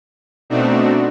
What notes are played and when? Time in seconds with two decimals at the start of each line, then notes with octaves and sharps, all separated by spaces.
0.50 B2 A3 C4 D4 D#4 F#4